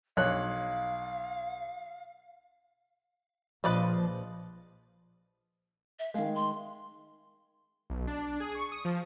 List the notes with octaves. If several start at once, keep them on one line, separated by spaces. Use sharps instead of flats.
B1 C#5 F5 F#6
A#1 F3 B4 D5 D#5
E5
D#3 G#3 F5
C6
B1
D4
G#4
C#6
D#6
F3